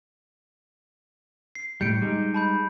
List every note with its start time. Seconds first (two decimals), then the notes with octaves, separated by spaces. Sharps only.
1.55 C7
1.81 A2 G3 G6 C#7 D7
2.02 G3 G#3 D#4
2.34 A5 B5 G6